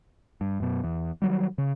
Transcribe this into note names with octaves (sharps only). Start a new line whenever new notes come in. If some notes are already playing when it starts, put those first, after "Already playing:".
G2
F#2 B2
E2
D#3 F#3 G3
C#3